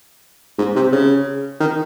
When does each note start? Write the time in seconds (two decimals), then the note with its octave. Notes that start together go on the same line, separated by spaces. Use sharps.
0.59 G#2
0.76 C3
0.92 C#3
1.60 D#3